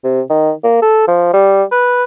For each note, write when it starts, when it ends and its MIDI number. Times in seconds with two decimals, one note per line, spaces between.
0.04 0.21 48
0.30 0.51 51
0.64 0.82 58
0.82 1.05 69
1.08 1.32 53
1.33 1.63 55
1.71 2.04 71